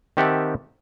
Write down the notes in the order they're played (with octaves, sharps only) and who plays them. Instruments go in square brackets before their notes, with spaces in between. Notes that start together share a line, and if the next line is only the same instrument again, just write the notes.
[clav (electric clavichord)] D#3 C4 G4 E5 F#5 A5